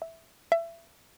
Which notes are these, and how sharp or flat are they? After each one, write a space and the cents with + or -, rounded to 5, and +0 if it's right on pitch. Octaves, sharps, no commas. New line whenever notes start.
E5 -5
E5 +25